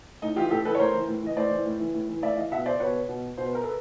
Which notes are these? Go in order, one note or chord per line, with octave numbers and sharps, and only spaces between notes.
A2 D#4
E3 F4 G4
A2 G4 A4
E3 A4 B4
C#5
A2 A#4 C5
E3
A2
E3 D#5
A2 C5 D5
E3
A2
E3
A2
E3
A2 D5 E5
E3 D#5 F5
B2 E5 F#5
C5 D5
B2 B4 C#5
B2
B2 C5
B4
A#4
A4 B4